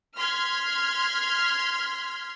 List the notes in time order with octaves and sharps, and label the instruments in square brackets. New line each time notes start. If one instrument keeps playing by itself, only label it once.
[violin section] C6 F6 G#6 B6